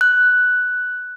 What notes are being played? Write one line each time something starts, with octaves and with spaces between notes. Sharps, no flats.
F#6